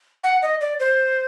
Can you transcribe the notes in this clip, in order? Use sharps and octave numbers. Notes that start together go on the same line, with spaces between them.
F#5
D#5
D5
C5